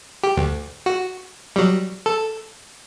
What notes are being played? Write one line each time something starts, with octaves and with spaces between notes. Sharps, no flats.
G4
D2
F#4
F#3 G3
A4